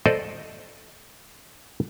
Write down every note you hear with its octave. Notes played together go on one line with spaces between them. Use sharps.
A4 C5 D5 D#5